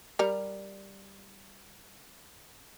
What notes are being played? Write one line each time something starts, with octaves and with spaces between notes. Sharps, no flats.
G3 A#4